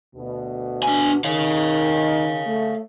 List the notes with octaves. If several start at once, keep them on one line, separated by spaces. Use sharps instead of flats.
D2 B2
D4 G#5
D#3 C#5 F5
A3